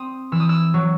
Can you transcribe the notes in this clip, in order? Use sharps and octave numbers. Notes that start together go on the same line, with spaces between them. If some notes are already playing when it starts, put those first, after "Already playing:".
Already playing: C4 D#6
E3 E6
D#6
E6
F#3